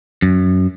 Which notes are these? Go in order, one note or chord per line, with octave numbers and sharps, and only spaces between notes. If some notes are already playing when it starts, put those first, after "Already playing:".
F#2